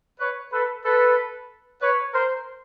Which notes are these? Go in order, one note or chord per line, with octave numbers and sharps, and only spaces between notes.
B4 C#5
A4 B4
A4 B4
B4 C#5
A#4 C5